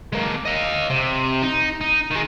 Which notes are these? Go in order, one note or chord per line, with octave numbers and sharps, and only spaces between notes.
G#3 A#3
D#5 F5
C3
D#4
D#4
D#3 G#3